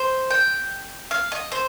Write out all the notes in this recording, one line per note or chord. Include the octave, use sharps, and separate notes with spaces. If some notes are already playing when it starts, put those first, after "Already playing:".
Already playing: C5
G5
F5
D#5
C5